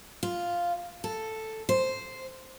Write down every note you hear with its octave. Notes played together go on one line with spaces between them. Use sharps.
F4
A4
C5